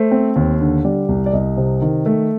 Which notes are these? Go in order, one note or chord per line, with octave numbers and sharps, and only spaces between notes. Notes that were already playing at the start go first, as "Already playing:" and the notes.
Already playing: A3 C5
C4
D#2
D3
G3 D5
C2
D5
C2 D#5
C3
D#3
A3